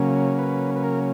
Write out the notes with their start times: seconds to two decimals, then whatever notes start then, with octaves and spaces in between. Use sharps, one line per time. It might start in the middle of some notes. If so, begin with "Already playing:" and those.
Already playing: C#3 F#3 A#3 C#4
0.39 B4
0.76 B4
0.84 A#4